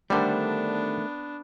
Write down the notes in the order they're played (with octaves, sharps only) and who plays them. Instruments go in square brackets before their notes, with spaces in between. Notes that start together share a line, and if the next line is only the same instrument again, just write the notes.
[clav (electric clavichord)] D3 G3 [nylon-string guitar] D#3 C5 [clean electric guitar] A3 [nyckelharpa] B3 D4